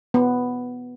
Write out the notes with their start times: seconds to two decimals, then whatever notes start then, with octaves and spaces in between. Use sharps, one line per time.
0.14 B3